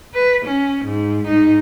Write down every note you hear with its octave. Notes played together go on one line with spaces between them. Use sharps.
B4
C#4
G#2
G#2 D#4